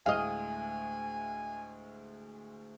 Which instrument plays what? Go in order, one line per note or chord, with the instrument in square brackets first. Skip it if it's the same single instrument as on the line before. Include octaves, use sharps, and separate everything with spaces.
[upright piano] D2 A2 G#3 [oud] D#5 F5 [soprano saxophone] G#5